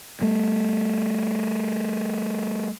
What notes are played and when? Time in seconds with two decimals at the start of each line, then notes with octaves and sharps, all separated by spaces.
0.22 G3 A3